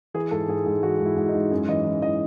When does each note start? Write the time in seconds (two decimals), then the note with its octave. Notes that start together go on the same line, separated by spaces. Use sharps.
0.14 E3 G#4
0.31 G#2 A4
0.48 G#2 G#4
0.66 G#2 G#4
0.83 E3 F#4
1.00 G#2
1.06 E4
1.17 G#2
1.28 D#4
1.35 G#2
1.51 F#2 G#4
1.69 E3 D#5
1.86 E3
2.02 E3 D#5